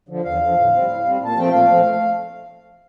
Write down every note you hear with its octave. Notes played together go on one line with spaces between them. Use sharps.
D3 F3
E2 F5
D3 F3
A2
G3 C4
A2
G3 C4
A#2 A5
F3 A3 C4 G5
A#2 F5
F3 A3 C4